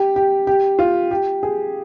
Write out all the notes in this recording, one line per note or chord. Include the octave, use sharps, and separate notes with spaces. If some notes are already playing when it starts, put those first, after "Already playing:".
Already playing: G4
G4
G4
F4
G4
G#4